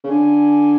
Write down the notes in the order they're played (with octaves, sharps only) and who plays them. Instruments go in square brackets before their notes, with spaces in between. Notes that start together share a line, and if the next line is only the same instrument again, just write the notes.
[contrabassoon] C#3
[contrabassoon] D3 [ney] G#5